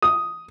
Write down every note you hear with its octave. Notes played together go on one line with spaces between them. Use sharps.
D#6